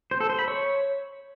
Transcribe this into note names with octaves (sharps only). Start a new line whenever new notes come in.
C5
A4
C5
B5
C#5